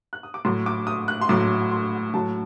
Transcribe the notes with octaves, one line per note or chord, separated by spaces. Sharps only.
F#6
D#6
D6
A2 F#3 C6
D6
D#6
F#6
C6
A2 F#3 D6
C6
A2 F#3 A5